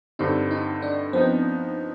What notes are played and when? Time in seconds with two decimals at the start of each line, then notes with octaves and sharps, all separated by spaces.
0.19 G2 D3 G3 C4 D#4
0.51 D#4
0.82 D4
1.13 F3 B3 C4 D#4